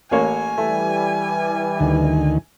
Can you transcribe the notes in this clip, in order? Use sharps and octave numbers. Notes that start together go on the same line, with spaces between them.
A1 A#3 C#5 G#5
E3 G3 A3
D2 D#3